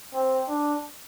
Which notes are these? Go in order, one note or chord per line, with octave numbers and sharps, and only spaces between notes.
C4
D4